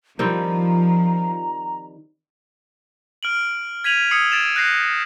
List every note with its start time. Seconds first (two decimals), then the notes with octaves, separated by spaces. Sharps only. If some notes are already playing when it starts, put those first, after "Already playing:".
0.19 D#3 F3 G3 C4 A#5
3.23 F6 D7 F#7
3.84 G#6 B6 D#7 F7 F#7
4.11 D#6 E6 G#6 C7 C#7 F#7
4.31 G#6 A6 D7 E7 F7
4.56 F#6 G6 A#6 C7